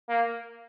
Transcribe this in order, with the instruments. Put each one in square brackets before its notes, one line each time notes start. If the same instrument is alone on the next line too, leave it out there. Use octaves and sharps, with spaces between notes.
[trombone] A#3